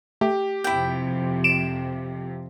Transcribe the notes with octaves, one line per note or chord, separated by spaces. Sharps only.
A3 G4
F2 C3 F3 E4 G5
D7 E7